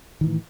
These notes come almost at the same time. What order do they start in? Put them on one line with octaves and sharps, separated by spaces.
D#3 E3 A2